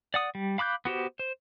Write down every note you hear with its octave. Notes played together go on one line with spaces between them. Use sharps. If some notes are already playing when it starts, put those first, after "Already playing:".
D5 F#5 D#6
G3
F5 B5 D6 F#6 G6
B3 F#4 G4 C5
C5